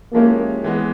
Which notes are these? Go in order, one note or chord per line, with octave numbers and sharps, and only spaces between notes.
F3 G#3 A#3 C#4 E4 G4
E3 G#3 B3